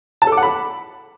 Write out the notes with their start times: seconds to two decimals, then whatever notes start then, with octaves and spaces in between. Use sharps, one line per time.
0.22 A5
0.27 A4
0.32 D6
0.37 F#5
0.43 B5